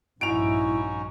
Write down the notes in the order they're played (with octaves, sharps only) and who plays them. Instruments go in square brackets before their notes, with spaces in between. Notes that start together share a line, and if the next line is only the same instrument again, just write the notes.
[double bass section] A#1 G2 [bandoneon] C#4 D#4 F#4 [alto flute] E4 [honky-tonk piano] D7 F7